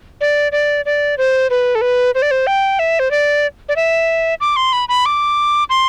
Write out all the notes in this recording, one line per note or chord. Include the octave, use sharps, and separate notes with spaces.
D5
D5
D5
C5
B4
A4
B4
C5
D5
C5
G5
E5
C5
D5
D5
E5
D6
C6
B5
B5
D6
C6